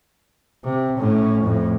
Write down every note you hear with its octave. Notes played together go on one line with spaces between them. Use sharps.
C3
A2 C#4
F2 A2